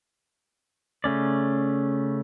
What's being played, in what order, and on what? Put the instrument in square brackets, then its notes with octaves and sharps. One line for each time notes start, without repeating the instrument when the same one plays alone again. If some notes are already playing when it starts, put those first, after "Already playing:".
[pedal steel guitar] C#3 A3 C#4 D5